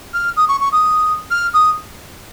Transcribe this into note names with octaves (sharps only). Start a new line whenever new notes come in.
F6
D#6
C#6
C#6
D#6
F6
D#6